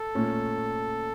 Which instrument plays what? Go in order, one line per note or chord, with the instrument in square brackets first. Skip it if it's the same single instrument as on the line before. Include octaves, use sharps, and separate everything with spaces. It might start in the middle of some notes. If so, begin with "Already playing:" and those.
Already playing: [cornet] A4
[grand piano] A#2 A3 C#4